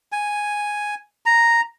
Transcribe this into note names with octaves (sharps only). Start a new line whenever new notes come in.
G#5
A#5